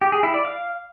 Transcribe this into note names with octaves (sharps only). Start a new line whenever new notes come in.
G4
G#4
E4
D5
F5